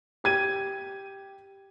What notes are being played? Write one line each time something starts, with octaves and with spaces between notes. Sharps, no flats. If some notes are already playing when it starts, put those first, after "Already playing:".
G4 G#6 D#7